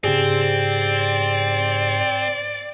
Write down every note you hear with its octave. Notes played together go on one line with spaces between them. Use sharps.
G#2 C#3 C4 G4 G#4 D5